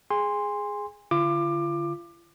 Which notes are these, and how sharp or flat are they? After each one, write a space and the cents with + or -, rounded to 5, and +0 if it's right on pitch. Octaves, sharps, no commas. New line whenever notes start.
G#4 +0 G#5 -30 C6 +0
D3 +0 F4 -35 D6 +20